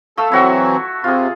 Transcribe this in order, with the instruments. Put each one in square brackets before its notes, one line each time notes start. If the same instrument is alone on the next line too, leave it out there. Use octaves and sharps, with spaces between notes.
[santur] A3 F5 E6 [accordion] A4
[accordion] E3 F#3 C4 [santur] E4 F#4 C#6
[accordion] C3 [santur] F4 G#4